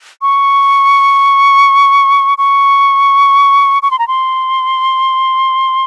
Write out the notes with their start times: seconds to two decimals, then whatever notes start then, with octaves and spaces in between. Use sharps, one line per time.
0.22 C#6
2.38 C#6
3.83 C#6
3.91 C6
3.99 A#5
4.08 C6